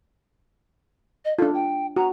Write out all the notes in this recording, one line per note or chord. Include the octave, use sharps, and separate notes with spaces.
D#5
D4 F4 A4
G5
F#4 A#5